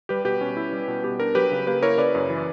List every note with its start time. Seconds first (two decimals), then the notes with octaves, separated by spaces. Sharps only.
0.09 G3 G4 B4
0.25 B2 G4 B4
0.41 C#4
0.57 E4
0.73 G3
0.88 B2
1.04 B3 G4
1.20 D4 A#4
1.35 F#3 G4 B4
1.52 C#3
1.67 A#3 G4 B4
1.82 E4 A#4 C#5
1.98 C#3 B4 D5
2.15 F#2
2.30 E3